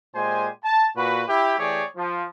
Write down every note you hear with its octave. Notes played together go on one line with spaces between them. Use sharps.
A#2 G#3 G4 C5 G#5
A5
A#2 F#4 B4
E4 G4
E3 A3 G4 G#4 C#5 D5
F3